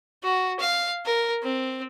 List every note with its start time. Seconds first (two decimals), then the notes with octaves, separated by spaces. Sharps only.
0.23 F#4
0.60 F5
1.05 A#4
1.42 C4